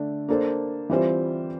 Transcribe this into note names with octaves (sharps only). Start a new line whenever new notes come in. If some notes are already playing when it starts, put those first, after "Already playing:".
Already playing: D3 A3 D4
A#3 D4 A4 C5
E3 G3 C4 F4 C5